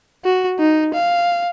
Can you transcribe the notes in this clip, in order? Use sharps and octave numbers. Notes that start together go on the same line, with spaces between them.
F#4
D#4
F5